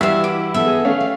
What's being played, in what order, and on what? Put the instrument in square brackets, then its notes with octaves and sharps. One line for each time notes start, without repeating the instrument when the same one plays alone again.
[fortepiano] G2 [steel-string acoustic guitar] E3 F#4 [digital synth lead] E4 [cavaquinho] E5 F5
[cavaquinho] D6
[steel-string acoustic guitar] B3 D#4 A4 [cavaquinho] E5
[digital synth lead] G#4
[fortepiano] A3 C#4 [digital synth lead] F5
[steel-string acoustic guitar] G4